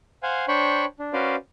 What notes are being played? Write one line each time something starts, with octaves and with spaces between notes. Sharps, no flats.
C5 F5 F#5 G#5
D4 C5 C#5 G5 B5 C#6
D4
C#4 F#4 B4 C5 D5 F5